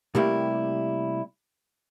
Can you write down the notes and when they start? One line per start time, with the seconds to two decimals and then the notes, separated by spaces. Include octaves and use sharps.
0.15 C3 G3 A3 A#3 E4 G4